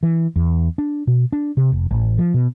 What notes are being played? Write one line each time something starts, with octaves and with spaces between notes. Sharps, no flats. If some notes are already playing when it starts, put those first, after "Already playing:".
E3
E2
D4
B2
D4
C3
F1
A1
F3
B2